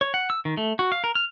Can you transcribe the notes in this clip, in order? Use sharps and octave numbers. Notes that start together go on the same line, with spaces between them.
C#5
F#5
E6
D#3
A3
F#4
F5
A#4
F6